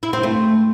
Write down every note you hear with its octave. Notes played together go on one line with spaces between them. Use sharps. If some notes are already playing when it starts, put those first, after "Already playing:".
E4
C4
A3